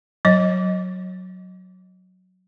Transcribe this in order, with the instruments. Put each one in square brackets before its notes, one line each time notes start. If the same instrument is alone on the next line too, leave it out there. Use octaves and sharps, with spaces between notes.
[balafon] F#3 D#5